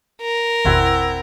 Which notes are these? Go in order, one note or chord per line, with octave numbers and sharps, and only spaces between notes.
A#4
G#1 E2 B2 C4 E4 F#5